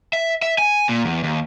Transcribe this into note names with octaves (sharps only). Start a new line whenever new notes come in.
E5
E5
G#5
A#2
E2
D#2